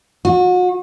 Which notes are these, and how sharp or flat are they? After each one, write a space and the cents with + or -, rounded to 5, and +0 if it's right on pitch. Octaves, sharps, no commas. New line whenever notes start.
F#4 -35